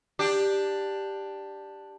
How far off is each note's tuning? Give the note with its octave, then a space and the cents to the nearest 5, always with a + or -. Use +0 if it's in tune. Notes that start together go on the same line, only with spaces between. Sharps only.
D4 +5 G4 +5